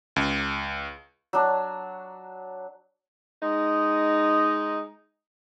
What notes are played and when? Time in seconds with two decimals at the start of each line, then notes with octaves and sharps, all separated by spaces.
0.16 C#2
1.33 F#3 D4
3.42 G#3 D#4